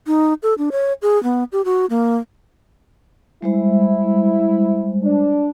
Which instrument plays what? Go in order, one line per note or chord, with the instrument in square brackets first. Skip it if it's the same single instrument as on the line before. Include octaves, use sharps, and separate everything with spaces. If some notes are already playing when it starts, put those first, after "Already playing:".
[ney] D#4
A4
D4
C#5
G#4
B3
G4
F#4
A#3
[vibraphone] G3 G#3 C5 [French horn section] E4
[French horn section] D4